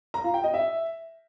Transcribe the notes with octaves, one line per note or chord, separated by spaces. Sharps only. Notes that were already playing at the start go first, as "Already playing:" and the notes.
A#5
F4
G5
D#5
E5